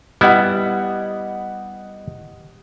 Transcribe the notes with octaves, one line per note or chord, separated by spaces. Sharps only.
G3 B3 E4 G4 D#5 F#5